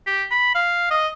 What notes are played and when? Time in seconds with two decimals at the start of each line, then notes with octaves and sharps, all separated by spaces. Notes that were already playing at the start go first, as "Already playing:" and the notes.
0.07 G4
0.31 B5
0.55 F5
0.91 D#5